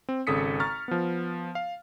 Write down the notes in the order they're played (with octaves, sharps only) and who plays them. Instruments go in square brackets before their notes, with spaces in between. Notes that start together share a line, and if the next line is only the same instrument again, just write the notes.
[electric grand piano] C4
G#1 C#3 A4 D#6 B6 C#7
A#5 C#6 F6 A6
F3 B3
F5